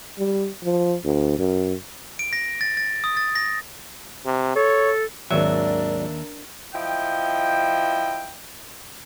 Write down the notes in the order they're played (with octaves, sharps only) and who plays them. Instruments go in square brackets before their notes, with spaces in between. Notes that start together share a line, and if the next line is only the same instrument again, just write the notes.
[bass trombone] G3
F3
D2
F#2
[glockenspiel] D7
A#6
A6
A6
D#6
A6
A#6
[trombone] C3
[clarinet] A4 [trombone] C#5
[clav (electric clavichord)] G#1 F#3 [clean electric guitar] D#2 E5 [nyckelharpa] D4 A#4 [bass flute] D5
[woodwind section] F3 E4 D#5 G5